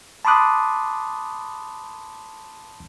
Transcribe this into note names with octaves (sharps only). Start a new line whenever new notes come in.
A5 B5 C6 D6 D#6 F#6